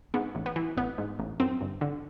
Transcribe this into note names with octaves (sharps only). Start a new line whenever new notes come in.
G#2 B3
A1
B3
E3
A1 B3
G#2
A1
F#2 C4
G1
D3